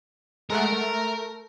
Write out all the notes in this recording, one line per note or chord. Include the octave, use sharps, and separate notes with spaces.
G#3 A3 A#4 F#5
A3